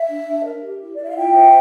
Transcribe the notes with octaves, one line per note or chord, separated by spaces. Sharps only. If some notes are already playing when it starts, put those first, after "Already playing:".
Already playing: E5
D4
D4
A#4
G4
E4
D5
E4 E5
F5
F4 E5 G5
C5